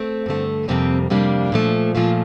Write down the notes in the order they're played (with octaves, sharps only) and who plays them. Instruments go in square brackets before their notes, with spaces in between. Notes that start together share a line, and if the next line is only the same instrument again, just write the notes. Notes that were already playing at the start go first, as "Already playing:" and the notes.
Already playing: [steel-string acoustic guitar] A3 C4
G2 D3 A3
F2 C3 G3 A#3 C4
F2 C3 G3 A#3 D4
A#2 F3 A3
A#2 F3 A3 F4